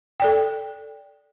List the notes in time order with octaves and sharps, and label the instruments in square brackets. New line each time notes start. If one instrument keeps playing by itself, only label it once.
[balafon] A4 D5 G5